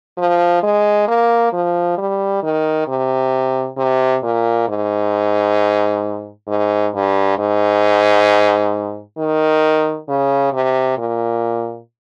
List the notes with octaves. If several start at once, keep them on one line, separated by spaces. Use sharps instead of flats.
F3
G#3
A#3
F3
G3
D#3
C3
C3
A#2
G#2
G#2
G2
G#2
D#3
C#3
C3
A#2